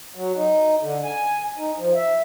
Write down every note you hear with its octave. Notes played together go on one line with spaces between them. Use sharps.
F#3
D#4
D3
G#5
D#4
F3
E5